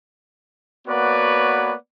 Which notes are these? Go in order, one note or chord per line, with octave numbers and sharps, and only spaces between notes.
A#3 B3 F#4 B4 C#5 D5